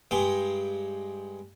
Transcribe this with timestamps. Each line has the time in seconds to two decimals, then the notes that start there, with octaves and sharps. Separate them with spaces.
0.11 G2 G#3 G5